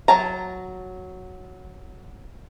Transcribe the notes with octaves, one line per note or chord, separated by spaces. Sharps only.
F#3 A5 A#5